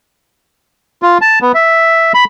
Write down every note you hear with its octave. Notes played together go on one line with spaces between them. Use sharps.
F4
A5
B3
E5
B5